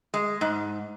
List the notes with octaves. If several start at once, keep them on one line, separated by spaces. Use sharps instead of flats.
G#3
G#2